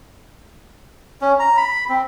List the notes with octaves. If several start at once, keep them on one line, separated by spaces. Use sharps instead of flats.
C#4
A#5
B5
C4